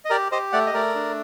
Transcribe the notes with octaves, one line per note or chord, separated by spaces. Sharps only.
D#5
G4 A#4 D5
G4 C5 D#5
A3 D5 F#5
D#5
A3 A#4 D5
D4